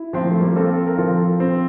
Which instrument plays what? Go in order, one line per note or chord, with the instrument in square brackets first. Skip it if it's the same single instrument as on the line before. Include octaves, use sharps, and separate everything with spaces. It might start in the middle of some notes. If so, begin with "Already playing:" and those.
Already playing: [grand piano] E4
[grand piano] F3 [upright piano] C4
[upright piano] A#3
A3
G3 A#3
[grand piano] C4 [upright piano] F4 A4
[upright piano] A#4
[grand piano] F3 [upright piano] F4 A4
[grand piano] C4